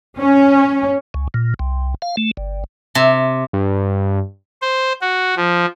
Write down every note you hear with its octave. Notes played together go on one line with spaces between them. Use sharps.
C#4
C#2
A#2
C2
F5
A3
G1
C3
G2
C5
F#4
F3